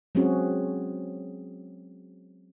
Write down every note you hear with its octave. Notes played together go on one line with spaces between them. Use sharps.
F#3 G#3 C4 C#4 F#4 G#4